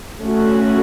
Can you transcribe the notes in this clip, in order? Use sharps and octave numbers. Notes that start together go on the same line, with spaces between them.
A3 C#4 F#4